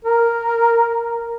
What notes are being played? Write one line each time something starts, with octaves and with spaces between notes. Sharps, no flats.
A#4